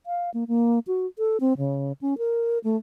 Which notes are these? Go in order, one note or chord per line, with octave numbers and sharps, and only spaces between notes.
F5
A#3
A#3
F#4
A4
C4
C#3
C#4
A#4
A3